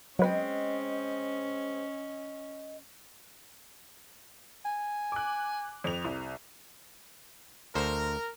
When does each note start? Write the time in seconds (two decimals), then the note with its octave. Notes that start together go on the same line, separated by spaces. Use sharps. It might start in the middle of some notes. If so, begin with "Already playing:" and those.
0.19 F#3 G#3 C4 C#4 B4 D#5
4.65 G#5
5.12 D6 F#6
5.84 F2 F7
6.04 C2
7.75 D2 A4 A#4 C5